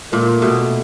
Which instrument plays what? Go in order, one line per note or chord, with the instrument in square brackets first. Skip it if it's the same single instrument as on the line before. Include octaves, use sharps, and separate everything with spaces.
[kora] A#2 [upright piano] A3
[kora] B2 [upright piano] A3